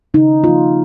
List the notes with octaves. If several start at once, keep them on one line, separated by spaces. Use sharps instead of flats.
C#3 D#4
F3 A#3 F4